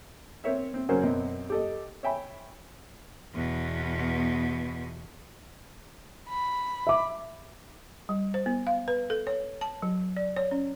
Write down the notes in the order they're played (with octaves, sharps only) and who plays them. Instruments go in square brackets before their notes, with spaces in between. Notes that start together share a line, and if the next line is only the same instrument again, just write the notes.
[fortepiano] C4 A#4 C#5 E5
C4
C#3 F#3 A#3 C#4 A#4 C5
F#2 B2 C4
G4 A4 D#5
C#5 E5 G5 G#5 B5
[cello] E2 B2
[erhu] B5
[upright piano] E5 D6
[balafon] G3
C5
B3
F5
B4
A4
C#5
A5
F#3
D5
C#5
C#4